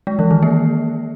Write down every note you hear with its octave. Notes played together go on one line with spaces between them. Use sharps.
G#3
E3
D#3
A#3